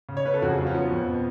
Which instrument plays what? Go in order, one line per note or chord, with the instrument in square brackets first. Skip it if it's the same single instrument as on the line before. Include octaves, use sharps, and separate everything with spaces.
[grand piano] C#3
C#5
C#3 B4
A4
F2 F#4
G#4
F#3 F4
C#4
F3 B3
F2
B2